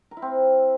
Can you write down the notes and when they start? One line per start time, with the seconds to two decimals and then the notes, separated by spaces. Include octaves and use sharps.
0.11 A#4
0.17 E4
0.22 C4